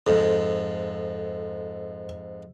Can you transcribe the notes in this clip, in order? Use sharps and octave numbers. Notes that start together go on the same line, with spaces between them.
F2 G#2 A4